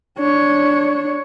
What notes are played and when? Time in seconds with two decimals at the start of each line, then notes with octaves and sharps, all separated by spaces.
0.18 D4 C#5